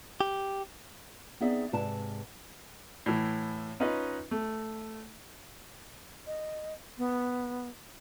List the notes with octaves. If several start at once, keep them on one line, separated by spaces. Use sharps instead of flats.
G4
B3 C4 D#4 G#4 D5 E5
G#2 C3 B4 D5 A5
A2 E3
C#4 D#4 F4 B4 D#5
A3
D#5
B3